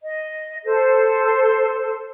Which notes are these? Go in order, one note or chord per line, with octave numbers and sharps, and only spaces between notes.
D#5
A4 C5